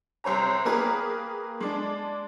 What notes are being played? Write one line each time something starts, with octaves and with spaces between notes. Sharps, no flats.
C2 C5 C#5 A#5
A#3 G4 G#4 A#4 B4
G#3 D4